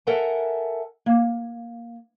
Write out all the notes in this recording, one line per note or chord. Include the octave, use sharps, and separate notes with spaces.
A4 A#4 E5 F#5 G#5
A#3